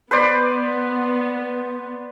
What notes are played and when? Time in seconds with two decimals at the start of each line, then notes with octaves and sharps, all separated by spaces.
0.11 B3 B4 C5 D5